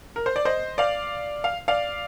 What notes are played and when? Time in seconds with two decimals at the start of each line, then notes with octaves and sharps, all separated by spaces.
0.16 A#4
0.26 C5
0.36 D5
0.45 C5 D#5
0.78 D5 F5
1.44 F5
1.68 D5 F5